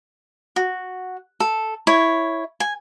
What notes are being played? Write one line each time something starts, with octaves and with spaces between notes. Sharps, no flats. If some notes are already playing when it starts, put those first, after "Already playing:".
F#4
A4
E4 C#5
G#5